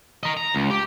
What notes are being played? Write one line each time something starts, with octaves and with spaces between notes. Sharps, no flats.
A#4 D#5
A#5
C#2
G4